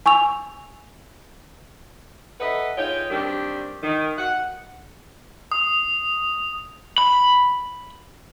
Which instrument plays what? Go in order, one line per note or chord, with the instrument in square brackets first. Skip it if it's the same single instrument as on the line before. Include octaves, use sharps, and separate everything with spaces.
[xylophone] G#5 C#6 E6 F7
[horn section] A4 B4 D#5 E5 F#5 B5
D#4 F4 G#4 C#5 G5
D#3 G3 C4 D4 G4
D#3
F#5
[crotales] D#6
[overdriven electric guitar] B5